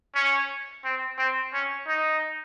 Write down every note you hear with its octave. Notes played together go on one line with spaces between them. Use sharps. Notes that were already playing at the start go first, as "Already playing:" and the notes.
C#4
C4
C4
C#4
D#4